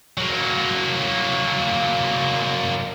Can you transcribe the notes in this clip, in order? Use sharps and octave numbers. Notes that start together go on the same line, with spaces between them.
F#3 A#3